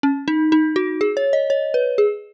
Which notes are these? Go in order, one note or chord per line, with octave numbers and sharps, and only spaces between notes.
C#4
D#4
D#4
F#4
G#4
C#5
D#5
C#5
B4
G#4